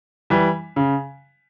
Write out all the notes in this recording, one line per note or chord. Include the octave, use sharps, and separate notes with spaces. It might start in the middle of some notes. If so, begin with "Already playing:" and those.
E3 G3
C#3